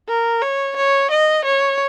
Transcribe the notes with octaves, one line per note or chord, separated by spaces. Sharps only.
A#4
C#5
C#5
D#5
C#5